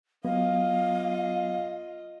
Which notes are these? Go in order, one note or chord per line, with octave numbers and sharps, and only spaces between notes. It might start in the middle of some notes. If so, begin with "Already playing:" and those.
F#3 B3 F4 D#5 F5